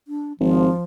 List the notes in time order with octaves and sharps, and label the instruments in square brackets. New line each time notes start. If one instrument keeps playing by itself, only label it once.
[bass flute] D4
[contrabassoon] G#1 [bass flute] F3